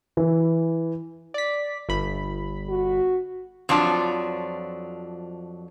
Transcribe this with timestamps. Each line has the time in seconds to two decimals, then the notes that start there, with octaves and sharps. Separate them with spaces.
0.17 E3
1.34 D5 B6
1.89 G1 B5
2.69 F#4
3.69 F2 F3 F#3 D4